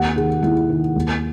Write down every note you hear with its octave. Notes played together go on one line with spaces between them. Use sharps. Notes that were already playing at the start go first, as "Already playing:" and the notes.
Already playing: D#2 F#5
D#3 G#4
D#2 E4
D#3
D#2